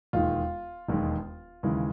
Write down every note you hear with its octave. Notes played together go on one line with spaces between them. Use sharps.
E1 D#2 D#3 G#3 F4
E1 D#2 D#3 G#3
D#2 C#3 E3 G#3